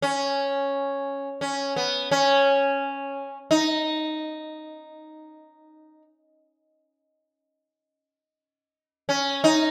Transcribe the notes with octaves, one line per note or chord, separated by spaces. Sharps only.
C#4
C#4
B3
C#4
D#4
C#4
D#4